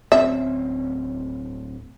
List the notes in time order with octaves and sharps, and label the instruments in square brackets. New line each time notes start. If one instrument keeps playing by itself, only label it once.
[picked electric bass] D1 C4 C#4 [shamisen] E5